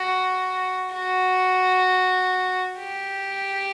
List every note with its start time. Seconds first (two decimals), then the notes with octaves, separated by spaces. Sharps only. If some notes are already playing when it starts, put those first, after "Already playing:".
Already playing: F#4
0.93 F#4
2.78 G4